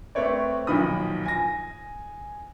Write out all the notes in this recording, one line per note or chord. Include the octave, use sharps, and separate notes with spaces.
A3 C4 B4 C#5 D5
B1 A#2 D#3 F3 B5 D#6
G#5 A#6